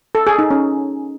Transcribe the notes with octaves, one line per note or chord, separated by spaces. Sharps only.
A4
G#4
D#4
C#4